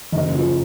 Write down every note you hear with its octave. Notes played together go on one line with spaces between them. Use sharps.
F#1 D#5
F3